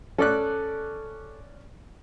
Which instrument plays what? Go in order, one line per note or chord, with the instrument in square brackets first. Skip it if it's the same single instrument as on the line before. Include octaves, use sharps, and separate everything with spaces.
[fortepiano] C#4 D5 F#6 [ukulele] A4